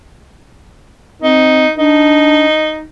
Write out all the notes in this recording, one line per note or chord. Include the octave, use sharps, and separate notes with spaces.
C4 D#4
D4 D#4